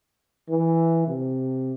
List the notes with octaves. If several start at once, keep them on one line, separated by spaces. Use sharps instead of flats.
E3
C3